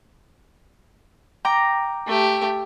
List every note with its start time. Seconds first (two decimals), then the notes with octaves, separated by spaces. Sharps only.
1.45 G5 A#5 D6
2.07 A3 G4